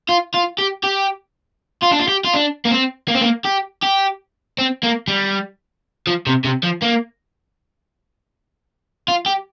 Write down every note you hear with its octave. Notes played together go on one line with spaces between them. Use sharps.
F4
F4
G4
G4
F4
D4
F4
G4
F4
D4
A#3
C4
A#3
C4
A#3
G4
G4
C4
A#3
G3
F3
C3
C3
F3
A#3
F4
G4